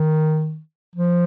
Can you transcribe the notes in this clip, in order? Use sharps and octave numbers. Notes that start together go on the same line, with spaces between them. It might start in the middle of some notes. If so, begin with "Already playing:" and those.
Already playing: D#3
F3